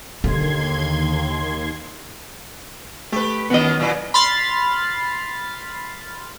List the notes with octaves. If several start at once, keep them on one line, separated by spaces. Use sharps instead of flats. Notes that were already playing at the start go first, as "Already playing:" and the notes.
D#2 D3 D4 C6 G#6
A3 G4 B4
F#2 D#3 E3 B3 D#5
A#2 F#3 E4
B5 C6 F6 A6 C7